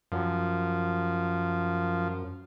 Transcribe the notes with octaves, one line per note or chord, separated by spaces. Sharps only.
F#2 F3